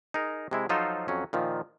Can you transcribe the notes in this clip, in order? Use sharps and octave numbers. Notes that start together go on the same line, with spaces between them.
D#4 G#4 A#4
C3 G#3 E4
F3 F#3 D#4 F4 A4 C5
F2 F#3 C#4
A#2 D#3 F3